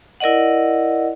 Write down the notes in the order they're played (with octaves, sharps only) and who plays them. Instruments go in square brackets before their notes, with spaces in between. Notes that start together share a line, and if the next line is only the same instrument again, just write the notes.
[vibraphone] E4 A#4 D5 D#5 F#5